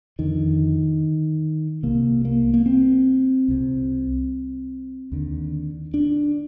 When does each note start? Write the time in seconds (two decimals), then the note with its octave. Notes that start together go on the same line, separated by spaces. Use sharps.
0.19 F2 D3 D#3
1.83 C2 C3 A#3
2.25 A#3
2.54 A#3
2.66 C4
3.48 C2 C3
5.12 D#2 D3
5.94 D4